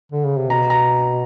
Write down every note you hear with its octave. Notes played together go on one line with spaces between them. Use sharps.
D3
C#3
C3
B2 A#5
A#5